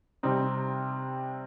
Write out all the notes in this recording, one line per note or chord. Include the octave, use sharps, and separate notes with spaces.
C3 G3 C4 D#4